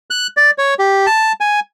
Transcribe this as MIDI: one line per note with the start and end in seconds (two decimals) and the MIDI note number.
0.10 0.27 90
0.37 0.51 74
0.58 0.74 73
0.79 1.06 67
1.07 1.32 81
1.41 1.60 80